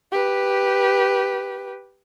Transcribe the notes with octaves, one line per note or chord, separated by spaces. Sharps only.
G4 B4